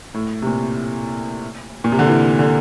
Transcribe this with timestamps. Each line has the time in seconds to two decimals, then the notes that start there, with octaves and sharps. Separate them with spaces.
0.14 A2
0.42 C3
0.47 A#2
1.84 A#2
1.92 C3
1.99 D3
2.07 E3
2.39 D3